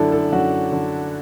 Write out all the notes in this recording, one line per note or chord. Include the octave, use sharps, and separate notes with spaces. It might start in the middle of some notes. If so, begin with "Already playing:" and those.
Already playing: F#2 D3 D4 E4 A4
A4
F#2 F#4
D3